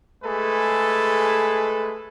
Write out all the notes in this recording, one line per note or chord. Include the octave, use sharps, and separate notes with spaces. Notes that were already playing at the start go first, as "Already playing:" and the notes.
G#3 A3 G#4 A4 B4